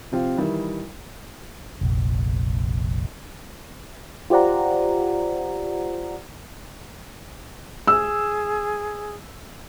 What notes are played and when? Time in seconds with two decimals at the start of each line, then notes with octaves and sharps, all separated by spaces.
0.12 C3 F3 C4 F4 G4
0.38 D#3 E3 G3 E4
1.81 F1 A#1
4.30 F4 G4 C5 D5 F#5 A#5
7.87 G#4 E6